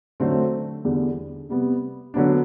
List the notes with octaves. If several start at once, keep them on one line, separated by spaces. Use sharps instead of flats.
D3 F#3 A3 C4
E2 D3 G3
C3 G3 B3
D3 F#3 B3 D4